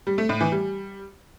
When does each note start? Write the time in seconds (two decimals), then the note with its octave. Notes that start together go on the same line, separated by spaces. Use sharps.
0.07 G3
0.18 A3
0.29 A2
0.41 E3
0.52 G3